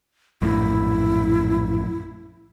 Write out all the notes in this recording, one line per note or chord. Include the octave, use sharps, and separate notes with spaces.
A#1 F#2 A2 E4